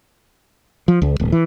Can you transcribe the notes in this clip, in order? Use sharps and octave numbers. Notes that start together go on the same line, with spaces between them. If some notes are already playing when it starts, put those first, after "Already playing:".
F3
C#2
D1
E3